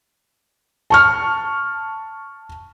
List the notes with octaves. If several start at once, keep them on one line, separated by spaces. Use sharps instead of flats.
A5 C#6 F6